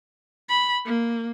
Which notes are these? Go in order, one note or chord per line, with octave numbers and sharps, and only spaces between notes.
B5
A#3